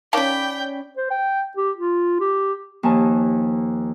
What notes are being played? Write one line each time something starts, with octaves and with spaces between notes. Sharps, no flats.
D#3 C#4 C#5 D5 F5 G5 A5 B5
C5
G5
G4
F4
G4
D#2 F3 G#5 A5